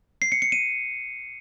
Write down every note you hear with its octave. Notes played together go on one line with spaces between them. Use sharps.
C7
C#7
C#7
D#7